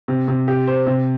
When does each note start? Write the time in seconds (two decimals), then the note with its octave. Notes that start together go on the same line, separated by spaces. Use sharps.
0.08 C3
0.28 C3
0.48 G4
0.67 C5
0.86 C3